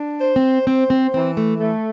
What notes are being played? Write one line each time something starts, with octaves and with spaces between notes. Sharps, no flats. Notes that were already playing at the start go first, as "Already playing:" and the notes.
Already playing: D4
C5
C4
C4 C5
C4
E3 C4
A3
A3